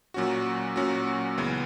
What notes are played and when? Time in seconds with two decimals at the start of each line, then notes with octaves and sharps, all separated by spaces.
0.14 A#2 F#3 C#4 F#4
0.76 A#2 F#3 C#4 F#4
1.38 C#2 C#3 E3 B3